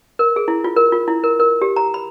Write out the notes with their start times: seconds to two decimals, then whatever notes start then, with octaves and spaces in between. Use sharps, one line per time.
0.19 A#4
0.36 G#4
0.48 E4
0.64 F4
0.76 A#4
0.92 F4
1.08 E4
1.23 A#4
1.40 A#4
1.62 G4
1.76 A#5
1.94 B5